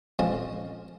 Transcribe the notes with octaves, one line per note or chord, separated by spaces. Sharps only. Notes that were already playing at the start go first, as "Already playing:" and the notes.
A#1 F2 F3 C#4 D#5 A5